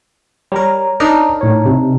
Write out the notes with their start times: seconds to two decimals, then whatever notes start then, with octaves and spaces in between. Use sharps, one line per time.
0.52 G3 A#4 C#5 A#5
1.00 D4 D#4 A#4
1.41 A2 C#5
1.66 C3